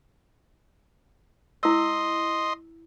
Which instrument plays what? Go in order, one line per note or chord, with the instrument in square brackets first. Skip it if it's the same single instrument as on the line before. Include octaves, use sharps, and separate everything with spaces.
[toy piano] E4 E6 [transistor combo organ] D#5 C6